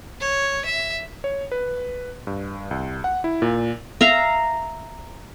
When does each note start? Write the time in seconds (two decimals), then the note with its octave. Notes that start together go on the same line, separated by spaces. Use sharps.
0.20 C#5
0.65 E5
1.24 C#5
1.52 B4
2.27 G2
2.71 C2
3.04 F#5
3.24 E4
3.42 A#2
4.01 E5 F5 A#5